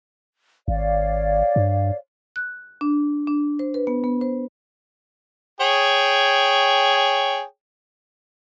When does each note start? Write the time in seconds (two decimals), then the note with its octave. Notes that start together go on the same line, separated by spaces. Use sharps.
0.68 G#1 C#5 D5 F5
1.56 G2
2.36 F#6
2.81 D4
3.27 D4
3.59 C5
3.74 B4
3.87 B3
4.04 B3
4.21 C5
5.61 G#4 C#5 G5